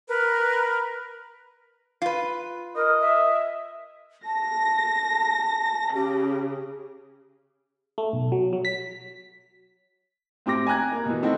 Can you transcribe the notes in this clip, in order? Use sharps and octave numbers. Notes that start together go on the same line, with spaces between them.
A#4 B4
F4 B4
A#4 D#5
E5
A5 A#6
C#3 G4
A3
B1
F#3
F#3
B6
A2 C4 G4 D6 A#6
G#5 A#5 F#6 G#6
A#3
B2 E3
D#3 A3 C4 D#4 E4 F#4